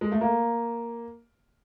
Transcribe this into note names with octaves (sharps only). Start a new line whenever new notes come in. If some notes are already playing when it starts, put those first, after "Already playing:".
G#3
A3
A#3